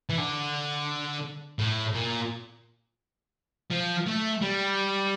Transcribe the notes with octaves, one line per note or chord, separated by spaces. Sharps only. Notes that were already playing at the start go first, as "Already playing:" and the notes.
E3
D3
A2
A#2
F3
A3
G3